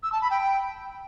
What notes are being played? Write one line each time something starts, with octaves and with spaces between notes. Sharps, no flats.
E6
A5
B5
G5